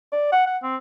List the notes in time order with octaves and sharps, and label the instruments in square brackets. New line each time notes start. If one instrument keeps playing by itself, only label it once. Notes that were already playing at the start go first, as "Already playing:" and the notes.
[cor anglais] D5
F#5
F#5
C4